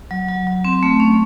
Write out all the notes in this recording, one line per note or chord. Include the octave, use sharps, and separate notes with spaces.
F#3
F#3
F#3
C4
A3
C#4